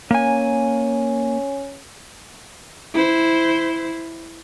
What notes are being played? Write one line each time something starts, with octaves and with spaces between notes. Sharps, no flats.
A#3 C#4 G#5
E4 C5